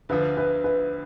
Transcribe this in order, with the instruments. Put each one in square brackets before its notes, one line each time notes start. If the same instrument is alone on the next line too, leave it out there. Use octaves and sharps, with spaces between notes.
[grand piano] D2 D3 F3 [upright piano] B4
[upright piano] B4
B4